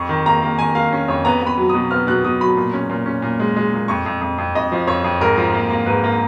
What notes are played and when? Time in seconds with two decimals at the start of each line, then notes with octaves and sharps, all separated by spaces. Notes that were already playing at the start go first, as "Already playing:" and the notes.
Already playing: F2 C#6
0.09 D#3
0.26 A#3 A#5
0.42 A#3
0.59 D#3 G#5
0.75 A#3 F5
0.93 C#4
1.08 F2 C#5
1.25 B3 A#5
1.42 B3 B5
1.58 F#3
1.69 B2 D#6
1.91 B3 F6
2.07 B2 F#6
2.24 B2 D#6
2.41 F#3 B5
2.56 A#2
2.74 C#4
2.90 A#2
3.06 C#4
3.22 A#2
3.40 G#3
3.56 G#3
3.73 A#2
3.88 F2 C#6
4.06 F2
4.21 F2
4.38 F2
4.55 F2 D#5
4.72 F3
4.87 F2 C#5
5.04 F2
5.21 G#2 A#4
5.38 F3
5.54 A#3
5.70 A#3
5.86 G#2 B4
6.04 A#3